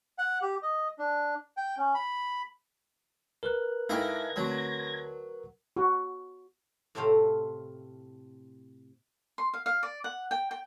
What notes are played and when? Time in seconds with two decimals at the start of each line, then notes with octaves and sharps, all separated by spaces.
0.18 F#5
0.42 G4
0.63 D#5
0.99 D4
1.57 G5
1.77 C#4
1.94 B5
3.43 A#4 B4 F#6
3.89 G#2 E4 A4 F5 G5 G#6 A#6
4.36 D2 F#3 C4
5.76 F#4
6.95 A2 C3 C4 A4 C5 F5
9.38 C6
9.54 F5
9.66 F5
9.83 D5
10.04 F#5
10.31 G5
10.51 G5